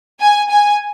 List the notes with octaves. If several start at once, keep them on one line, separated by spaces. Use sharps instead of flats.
G#5
G#5